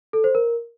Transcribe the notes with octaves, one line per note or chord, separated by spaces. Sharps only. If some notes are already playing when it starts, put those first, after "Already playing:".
A4
C5
A#4